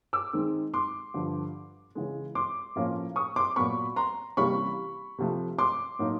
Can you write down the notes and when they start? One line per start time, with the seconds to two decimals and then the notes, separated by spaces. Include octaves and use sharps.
0.13 D6 E6
0.33 D#3 G#3 C4 D#4
0.74 C6 D6
1.14 G2 D3 F3
1.95 C#3 E3 G#3
2.35 C6 D6
2.76 A2 F3 A#3 C#4
3.16 C#6 D#6
3.36 C6 D6
3.56 A#2 F#3 B3 B5 C#6
3.96 A#5 C6
4.37 C3 E3 G3 A#3 C#4 B5 C#6
5.18 C3 F3 A3
5.59 C6 D6
5.99 A2 F#3 A#3 D#4